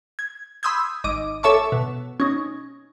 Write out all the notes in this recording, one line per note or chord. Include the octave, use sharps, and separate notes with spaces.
G#6
B5 C6 D#6 E6 G6 G#6
G#1 D#5 D6
A4 C#5 E5 A5 C#6 D6
B2
C#4 D#4